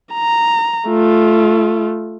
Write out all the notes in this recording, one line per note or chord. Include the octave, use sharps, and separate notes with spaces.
A#5
A3 F4